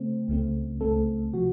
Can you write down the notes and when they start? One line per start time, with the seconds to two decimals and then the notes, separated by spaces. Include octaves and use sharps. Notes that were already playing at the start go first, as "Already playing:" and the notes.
Already playing: C#3 A3 C4
0.28 C#2 C#3 A3 C4
0.81 C#2 C#3 A3 C4 A4
1.33 C3 F3 F#4